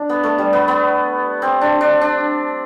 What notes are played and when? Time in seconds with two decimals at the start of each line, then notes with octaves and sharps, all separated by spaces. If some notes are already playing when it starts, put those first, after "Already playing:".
Already playing: D4
0.09 B3
0.23 A3
0.38 G3
0.53 B3
0.68 B3
1.42 C4
1.61 D4
1.81 D4
2.01 D4